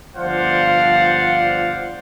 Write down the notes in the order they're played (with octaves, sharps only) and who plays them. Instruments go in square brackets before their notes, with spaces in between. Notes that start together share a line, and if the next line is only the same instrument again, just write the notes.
[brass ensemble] G1 F3 C5 D5 F5 F#5